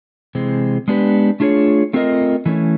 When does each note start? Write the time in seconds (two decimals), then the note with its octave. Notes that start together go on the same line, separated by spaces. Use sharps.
0.35 C3 E3 G#3 C4
0.88 G#3 B3 D4 G4 B4
1.40 A3 D4 F4 G#4 C#5
1.93 A3 C4 F4 A#4 D#5
2.46 E3 A3 C#4